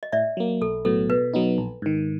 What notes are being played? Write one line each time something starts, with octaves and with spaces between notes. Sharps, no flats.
D#5
A2 D5 E5
F#3 A#3
B1 A4
A2 F#3 B3 A4
B2 B4
F#3 B3 D#4
A#1
G#2 D#3